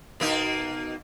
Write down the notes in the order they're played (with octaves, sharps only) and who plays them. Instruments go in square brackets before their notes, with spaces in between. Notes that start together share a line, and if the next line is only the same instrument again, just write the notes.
[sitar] B2 A#3 D#4